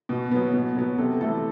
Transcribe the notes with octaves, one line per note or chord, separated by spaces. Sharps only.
B2
F#3 B3
B2
F#3 B3
C3 A4
E3 A3 A4